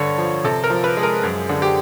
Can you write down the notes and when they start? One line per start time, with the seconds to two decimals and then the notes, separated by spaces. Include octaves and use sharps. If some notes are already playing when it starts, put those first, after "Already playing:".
Already playing: G2 D3 C#5
0.18 F3
0.44 C3 A4
0.64 A#4
0.70 F3
0.84 B4
0.97 G#3
1.03 A#4
1.23 F#2
1.49 D3
1.62 G4